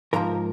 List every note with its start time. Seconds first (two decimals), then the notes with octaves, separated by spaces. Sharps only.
0.13 G#2 F3 A#3 A#4 A#5